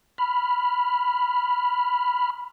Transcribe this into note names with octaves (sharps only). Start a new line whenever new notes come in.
B5 F6